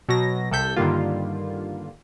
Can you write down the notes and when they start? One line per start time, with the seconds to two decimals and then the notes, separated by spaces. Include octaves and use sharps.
0.09 B2 F#3 A#6
0.51 C2 C3 A4 G6 B6
0.76 G2 D3 D#3 G3 A#3 F4